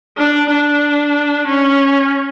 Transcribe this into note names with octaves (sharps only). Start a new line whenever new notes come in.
D4
D4
C#4